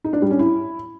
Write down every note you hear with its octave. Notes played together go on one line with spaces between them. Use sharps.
D#4
D4
G3
C#4
E4